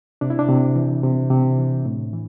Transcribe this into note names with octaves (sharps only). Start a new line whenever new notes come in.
C3 D4
E4
D4
C3
E3
C3
C3
E3
A2
E3